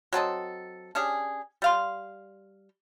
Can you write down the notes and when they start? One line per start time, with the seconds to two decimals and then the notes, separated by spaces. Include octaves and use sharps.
0.13 F#3 C4 A4 D#5
0.95 C#4 D4 G4 G#4
1.62 G3 F5 C6